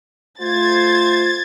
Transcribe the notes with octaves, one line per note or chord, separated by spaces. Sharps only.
A3 F4 C5 G#6 A6